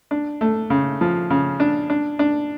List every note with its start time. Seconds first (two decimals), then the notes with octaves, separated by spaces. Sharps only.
0.11 D4
0.41 A3
0.70 C#3
1.01 F3
1.30 C#3
1.60 D4
1.90 D4
2.19 D4